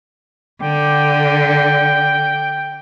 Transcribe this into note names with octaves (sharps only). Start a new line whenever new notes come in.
D3 G5